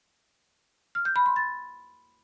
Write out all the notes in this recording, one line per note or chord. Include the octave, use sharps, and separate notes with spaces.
F6
G6
B5
C6
A6